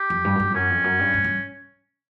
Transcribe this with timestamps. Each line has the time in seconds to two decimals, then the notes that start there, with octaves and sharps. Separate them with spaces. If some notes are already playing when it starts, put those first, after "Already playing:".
Already playing: G4
0.10 F2
0.25 G2
0.35 F#2
0.40 G2
0.50 F2
0.54 F#2 C#4
0.70 F2
0.84 F#2
0.99 G2
1.14 G2
1.24 G2